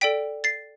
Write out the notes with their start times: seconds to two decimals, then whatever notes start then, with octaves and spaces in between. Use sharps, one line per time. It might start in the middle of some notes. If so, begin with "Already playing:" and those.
0.01 A4 D5 G5 B6 D7
0.44 A6 C7